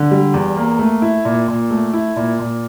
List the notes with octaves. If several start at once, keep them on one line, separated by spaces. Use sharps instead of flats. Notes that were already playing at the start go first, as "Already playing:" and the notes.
Already playing: D3
G3
E2
A#3
A3
E4
A#2
A#2
A3
E4
A#2
A#2